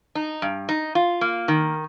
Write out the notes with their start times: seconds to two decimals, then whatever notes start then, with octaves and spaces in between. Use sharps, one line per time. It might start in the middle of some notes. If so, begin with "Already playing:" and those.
0.15 D#4
0.42 G2
0.69 D#4
0.95 F4
1.21 A#3
1.48 D#3